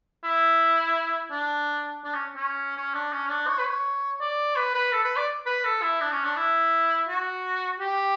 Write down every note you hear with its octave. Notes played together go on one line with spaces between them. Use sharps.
E4
D4
D4
C#4
C#4
C#4
D4
C#4
D4
C#5
B4
C#5
D5
B4
B4
A4
B4
D5
B4
A4
E4
D4
C#4
D4
E4
F#4
G4